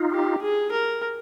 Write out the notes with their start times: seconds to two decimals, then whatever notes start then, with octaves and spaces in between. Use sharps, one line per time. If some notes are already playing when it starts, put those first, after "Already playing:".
Already playing: D#4 F4
0.11 G4
0.42 G#4
0.72 A#4